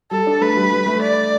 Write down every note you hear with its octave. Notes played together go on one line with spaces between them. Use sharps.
G3 A4
D4
A3 B4
G3
G3
A3
D5